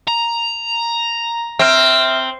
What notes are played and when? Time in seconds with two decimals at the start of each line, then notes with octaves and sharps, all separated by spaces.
0.08 A#5
1.59 C4 E5 F6